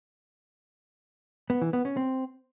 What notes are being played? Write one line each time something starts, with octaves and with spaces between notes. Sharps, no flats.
B3
E3
B3
C#4
C4